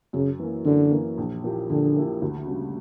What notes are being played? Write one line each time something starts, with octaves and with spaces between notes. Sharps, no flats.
F#2 C#3
E3 A#3
F#2 D3
E3 A#3
A#1
A#2 A#3 E4 G4
A#1 D3
A#2 A#3 E4 G4
D2
C#3 G3